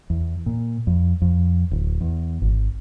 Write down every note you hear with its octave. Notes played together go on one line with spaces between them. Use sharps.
E2
A#2
F2
F2
D1
E2
G#1